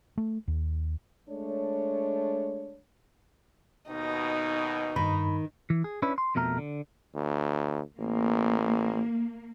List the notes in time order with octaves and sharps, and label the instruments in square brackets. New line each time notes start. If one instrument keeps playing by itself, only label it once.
[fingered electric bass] A3
D#2
[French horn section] G#3 A3 D4 C#5
[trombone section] D#2 B2 [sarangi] D#4
[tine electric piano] G2 B5 [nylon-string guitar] D#3
[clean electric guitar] E3
G#4
C#4 D4 E4 B4
C6
F2 B2 A3 A#4 A#5
D3
[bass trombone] D2
[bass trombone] A1 [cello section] A#3